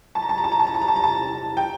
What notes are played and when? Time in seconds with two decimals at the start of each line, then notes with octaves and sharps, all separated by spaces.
0.15 A5
0.22 A#5
0.29 A5
0.38 A#5
0.44 A5
0.52 A#5
0.60 A5
0.67 A#5
0.74 A5
0.82 A#5
0.88 A5
0.96 A#5
1.04 A5
1.57 G5